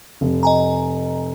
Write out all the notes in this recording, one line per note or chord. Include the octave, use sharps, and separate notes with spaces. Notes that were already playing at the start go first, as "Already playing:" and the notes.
F1
D#5 G#5 A#5